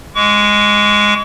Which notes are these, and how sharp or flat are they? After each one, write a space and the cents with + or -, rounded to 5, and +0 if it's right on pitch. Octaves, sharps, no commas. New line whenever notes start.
G#3 +0 C#6 +40